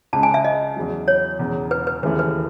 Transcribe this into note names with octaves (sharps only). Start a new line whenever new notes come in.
C#2 C#3 G#3 C#4 A5
G#5
E5
D#5
E2 C#3 F#3
C#5
E1 E2 C#3
B4
B4
D#2 C#3 E3 A3 B4
B4